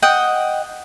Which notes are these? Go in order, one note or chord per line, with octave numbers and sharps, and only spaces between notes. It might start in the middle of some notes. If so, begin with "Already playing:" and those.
D#5 F#5 G5